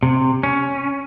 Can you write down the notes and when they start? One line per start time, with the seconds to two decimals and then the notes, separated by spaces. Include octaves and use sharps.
0.03 C3
0.43 C#4